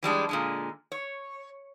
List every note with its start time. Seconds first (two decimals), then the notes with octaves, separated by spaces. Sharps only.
0.03 E3 G3 G#3 D4
0.29 A#2 D3 G#3
0.92 C#5